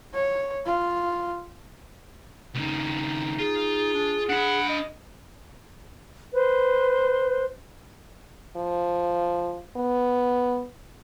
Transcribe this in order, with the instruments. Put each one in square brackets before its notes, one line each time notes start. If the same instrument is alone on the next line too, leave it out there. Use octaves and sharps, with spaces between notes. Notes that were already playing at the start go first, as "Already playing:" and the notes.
[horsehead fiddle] C#5
F4
[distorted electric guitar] D#2 C#3 [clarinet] D#4
[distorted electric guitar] F4 [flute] G#4
[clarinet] D4
[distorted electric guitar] D4 B5 [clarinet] F#5
[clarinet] D#5
[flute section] B4 C5
[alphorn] F3
B3